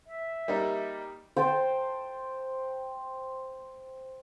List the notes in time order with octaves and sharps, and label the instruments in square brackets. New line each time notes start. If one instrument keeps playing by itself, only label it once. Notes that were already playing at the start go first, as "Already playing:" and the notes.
[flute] E5
[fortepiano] G3 A#3 D#4
[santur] C5 G5 A5